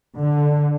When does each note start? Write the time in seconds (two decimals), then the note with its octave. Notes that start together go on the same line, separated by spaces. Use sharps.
0.15 D3